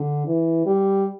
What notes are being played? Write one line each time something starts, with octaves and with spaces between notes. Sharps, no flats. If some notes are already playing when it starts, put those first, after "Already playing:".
Already playing: D3
E3
G3